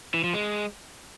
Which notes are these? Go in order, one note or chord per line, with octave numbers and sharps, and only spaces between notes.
E3
F3
G#3